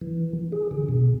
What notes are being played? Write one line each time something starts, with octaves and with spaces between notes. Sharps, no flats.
E3
G#4
D3
B2